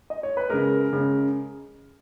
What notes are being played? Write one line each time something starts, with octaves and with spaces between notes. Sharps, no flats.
D#5
C#5
B4
C#3 G#3 A#4
C#3 G#3